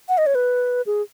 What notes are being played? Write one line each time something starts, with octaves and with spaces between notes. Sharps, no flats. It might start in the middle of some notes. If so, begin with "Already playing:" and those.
F#5
D#5
C#5
B4
G#4